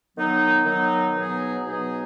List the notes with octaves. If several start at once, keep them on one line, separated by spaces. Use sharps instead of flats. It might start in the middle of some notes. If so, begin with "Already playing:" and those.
D#3 F#3 B3 D#4
D#3 F#3 B3 D#4
B2 F#3 B3 D#4 G#4
B2 F#3 B3 D#4 G#4